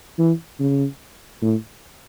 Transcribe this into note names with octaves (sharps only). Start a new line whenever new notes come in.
E3
C#3
A2